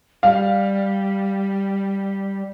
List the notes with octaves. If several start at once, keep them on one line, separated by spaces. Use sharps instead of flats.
G3 F5